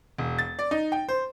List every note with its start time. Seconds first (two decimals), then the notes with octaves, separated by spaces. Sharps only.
0.18 E1
0.38 A6
0.59 D5
0.71 D#4
0.92 G5
1.09 C5